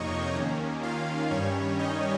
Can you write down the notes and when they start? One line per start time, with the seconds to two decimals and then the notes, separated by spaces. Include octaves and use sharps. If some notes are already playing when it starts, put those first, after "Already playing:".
Already playing: F2 C3 F3 A#3 D#4 C#5 D#5 C#6
0.35 D#2 D#3 A#3 C#4
0.83 F4 F5
1.31 G2 D#3 G3 C#4 C#5
1.79 D#4 D#5